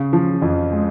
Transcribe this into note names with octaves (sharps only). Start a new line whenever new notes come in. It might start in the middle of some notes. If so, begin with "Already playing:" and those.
Already playing: C#3
F3
F2
G#3